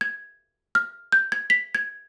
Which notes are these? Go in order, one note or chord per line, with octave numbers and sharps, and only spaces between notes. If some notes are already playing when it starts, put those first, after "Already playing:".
G#6
F6
G6
G#6
B6
G#6